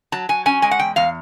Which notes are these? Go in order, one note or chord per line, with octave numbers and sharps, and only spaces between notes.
F#3 A5
F#3 G#5
C#4 G#5
G#3 G#5
F#5
E2 G5
E2 F5